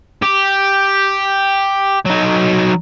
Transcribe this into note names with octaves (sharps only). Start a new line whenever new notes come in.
G4
F#3 D#4